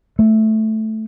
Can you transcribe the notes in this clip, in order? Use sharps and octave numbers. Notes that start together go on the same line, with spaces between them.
A3